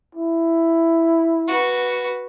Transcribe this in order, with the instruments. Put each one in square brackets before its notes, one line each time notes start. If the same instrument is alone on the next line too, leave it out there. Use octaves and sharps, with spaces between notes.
[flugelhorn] E4
[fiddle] F#4 B4